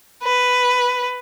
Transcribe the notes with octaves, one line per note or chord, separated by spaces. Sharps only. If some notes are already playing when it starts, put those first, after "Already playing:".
B4